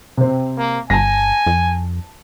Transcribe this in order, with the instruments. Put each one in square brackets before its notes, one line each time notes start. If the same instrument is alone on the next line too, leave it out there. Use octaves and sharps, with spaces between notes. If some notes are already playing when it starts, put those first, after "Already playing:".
[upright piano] C3 C4
[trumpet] A#3
[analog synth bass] G1 [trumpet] G#5 [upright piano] A5 A#6
[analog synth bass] F2